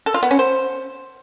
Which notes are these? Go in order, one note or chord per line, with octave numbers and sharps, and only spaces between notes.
A4
F4
B3
C#4
C5